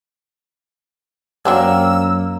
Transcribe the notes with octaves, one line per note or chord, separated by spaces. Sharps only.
F#2 F#3 A#3 C4 D4 E6